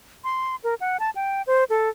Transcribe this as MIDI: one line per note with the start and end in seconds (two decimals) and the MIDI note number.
0.24 0.56 84
0.64 0.75 70
0.80 0.97 78
1.00 1.10 81
1.16 1.42 79
1.47 1.64 72
1.70 1.89 69